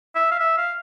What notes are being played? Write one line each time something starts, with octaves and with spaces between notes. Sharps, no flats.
E5
F5
E5
F5